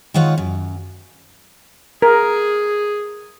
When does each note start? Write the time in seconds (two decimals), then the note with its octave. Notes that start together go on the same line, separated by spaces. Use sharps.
0.14 D#3 G#3 F4 C#5 F#5
0.38 F#2
2.02 G#4 A#4